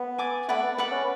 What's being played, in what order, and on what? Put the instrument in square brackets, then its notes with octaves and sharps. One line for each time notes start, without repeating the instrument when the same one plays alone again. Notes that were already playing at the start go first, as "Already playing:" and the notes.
Already playing: [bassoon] B3
[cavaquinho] D5 G#5 D6
[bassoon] A3 [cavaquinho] B4 D5 F#5
[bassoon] B3
[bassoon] B3 [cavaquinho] B4 D5 F#5
[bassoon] C#4